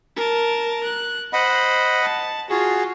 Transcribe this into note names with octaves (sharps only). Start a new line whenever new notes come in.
A#4 A5
F#6
C5 D#5 F#5 B5
A5
F4 F#4 G#4